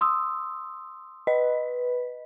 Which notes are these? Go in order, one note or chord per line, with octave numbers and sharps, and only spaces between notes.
C6 D#6 E6
B4 D#5